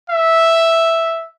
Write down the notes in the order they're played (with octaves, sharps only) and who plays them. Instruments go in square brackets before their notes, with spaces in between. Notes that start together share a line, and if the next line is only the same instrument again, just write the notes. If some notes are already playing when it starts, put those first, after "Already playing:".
[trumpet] E5